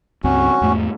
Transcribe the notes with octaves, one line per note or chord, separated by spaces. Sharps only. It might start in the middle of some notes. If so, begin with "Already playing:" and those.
C#2 G2 C4 C#4 F#4
E2 G#2 A3